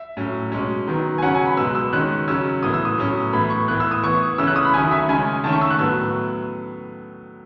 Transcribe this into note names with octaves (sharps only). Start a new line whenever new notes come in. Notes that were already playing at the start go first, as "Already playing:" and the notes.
Already playing: E5
A2 F#3 C#4
B2 G#3 C#4
D#3 F#3 B3
G#5
C#3 F#3 C#4 F#5
G#5
B5
B2 G#3 B3 E6
E6
D#3 G#3 C#4 F#6
C#3 F#3 C#4 E6
A2 E3 B3 D#6
E6
D#6
A2 F#3 C#4
A2 E3 B3 B5
C#6
A2 E3 B3 F#6
E6
D#6
E3 B3 C#6
C#3 E3 A3 C#4 E6
F#6
D#6
B5
D#3 F#3 A3 C#4 G#5
E5
C#3 G#3 C#4 G#5
D#3 A3 C#4 A5
C#6
E6
F#6
A2 F#3 B3 E6